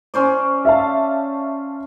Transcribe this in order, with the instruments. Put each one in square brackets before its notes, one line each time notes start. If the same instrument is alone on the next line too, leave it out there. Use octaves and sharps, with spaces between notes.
[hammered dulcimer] C#4 C5 D5
[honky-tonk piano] E5 F5 A5